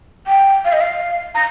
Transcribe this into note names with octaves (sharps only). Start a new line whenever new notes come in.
G5
F5
D#5
F5
A#5